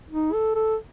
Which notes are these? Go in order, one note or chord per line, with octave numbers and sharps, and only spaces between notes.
D#4
A4
A4